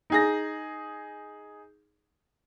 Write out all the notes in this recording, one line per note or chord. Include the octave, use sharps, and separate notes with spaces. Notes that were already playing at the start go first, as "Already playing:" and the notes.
D#4 G#4 A#6